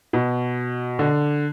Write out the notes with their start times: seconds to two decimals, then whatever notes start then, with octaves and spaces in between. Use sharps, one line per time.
0.13 B2
0.99 D3